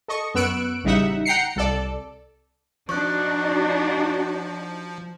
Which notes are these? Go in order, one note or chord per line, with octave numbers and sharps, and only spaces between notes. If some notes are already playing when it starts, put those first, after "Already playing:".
A4 D#5 C#6
F#2 B3 C#6 E6 F#6 D7
A1 C#3 G3 D#4 E5 F#5
F#5 G5 A#5 C7 C#7
C2 A4 D5
F3 D4 D#4 F#4 C#6 F#6